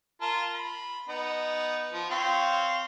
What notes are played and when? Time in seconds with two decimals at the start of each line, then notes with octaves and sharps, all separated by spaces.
0.21 F4 A#4 A5
0.54 B5
1.09 B3 D#4
1.93 F3
2.10 C4 C#5 F5